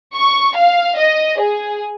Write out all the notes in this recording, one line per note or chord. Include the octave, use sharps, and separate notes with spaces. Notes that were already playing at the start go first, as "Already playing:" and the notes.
C#6
F5
D#5
G#4